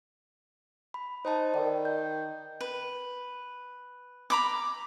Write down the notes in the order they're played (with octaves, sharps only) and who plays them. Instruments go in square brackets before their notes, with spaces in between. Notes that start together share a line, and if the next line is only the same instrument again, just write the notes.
[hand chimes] B5
[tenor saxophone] D#4 [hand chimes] C5 A5
[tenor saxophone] D#3 [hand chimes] A#4 D5
[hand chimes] G6
[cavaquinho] B4
A#5 B5 D6